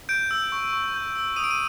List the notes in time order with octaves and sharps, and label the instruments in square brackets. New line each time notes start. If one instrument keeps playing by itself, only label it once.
[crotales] G6 D7
E6
C#6
C#6
G6
E6
D#6 D#7
D7
D#7